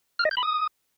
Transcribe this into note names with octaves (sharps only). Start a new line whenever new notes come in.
F6
D#5
G6
B5
D#6